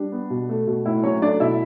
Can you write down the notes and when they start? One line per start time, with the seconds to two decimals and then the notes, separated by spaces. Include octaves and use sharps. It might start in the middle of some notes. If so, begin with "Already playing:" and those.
Already playing: G3 D4
0.12 B3
0.30 B2
0.49 A3
0.67 B2
0.86 A2 E4
1.03 F#3 C#4 C#5
1.22 A3 D4 D5
1.40 B2 E4 E5